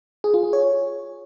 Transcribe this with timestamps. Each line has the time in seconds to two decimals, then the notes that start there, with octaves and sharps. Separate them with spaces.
0.24 G#4
0.34 F4
0.43 G#4
0.53 C#5